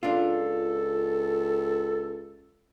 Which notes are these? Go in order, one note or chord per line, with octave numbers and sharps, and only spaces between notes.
C#2 D4 F4 A4